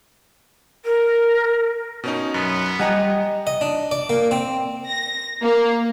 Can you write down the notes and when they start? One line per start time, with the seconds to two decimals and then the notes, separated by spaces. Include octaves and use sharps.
0.85 A#4
2.04 B2 C#4 D#4
2.34 F#2 B3
2.79 G3 G4 D#5 F#5 G#5 A#5
3.47 D#5
3.61 D4
3.91 D5
4.10 A#3
4.31 C4
4.87 A#6
5.42 A#3